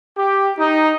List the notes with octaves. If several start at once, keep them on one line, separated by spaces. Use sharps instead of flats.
G4
D#4